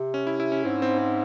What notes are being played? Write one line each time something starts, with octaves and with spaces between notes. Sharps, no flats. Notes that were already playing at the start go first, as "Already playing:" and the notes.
Already playing: C3
C#4
E4
E4
C#4
G#2 C4
C4
C4